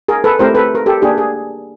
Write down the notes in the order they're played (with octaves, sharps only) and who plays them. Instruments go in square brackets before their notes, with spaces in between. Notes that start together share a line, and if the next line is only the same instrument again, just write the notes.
[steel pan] G#4 A#4
A4 B4
A3 C4 E4 G4 A#4 C5
A4 B4
A#4
G4 A4
A#3 D4 G4 G#4
G#4